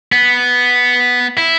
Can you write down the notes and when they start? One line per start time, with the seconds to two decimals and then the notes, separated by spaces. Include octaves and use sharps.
0.12 B3
1.38 E4